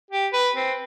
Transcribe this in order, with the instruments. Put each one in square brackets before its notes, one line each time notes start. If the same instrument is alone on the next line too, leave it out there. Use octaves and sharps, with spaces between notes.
[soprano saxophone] G4
B4
C4